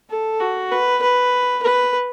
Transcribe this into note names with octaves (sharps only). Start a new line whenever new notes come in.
A4
F#4
B4
B4
B4